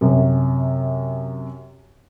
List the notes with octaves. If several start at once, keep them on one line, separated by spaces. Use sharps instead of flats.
F#2 C3